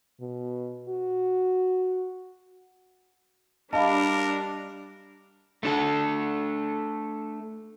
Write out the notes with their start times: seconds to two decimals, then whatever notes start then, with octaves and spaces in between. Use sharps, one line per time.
0.21 B2
0.89 F#4
3.73 G3 D4 A#4 D#5 F5 A5 B5
5.63 A3 D4 A4